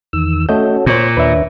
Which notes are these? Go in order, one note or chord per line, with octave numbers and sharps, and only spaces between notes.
E2 D#3 E6
A3 C#4 F#4 A4 D#5 G6
A#2 C5 C#5 G6
D#2 D4 B4 C#5 E5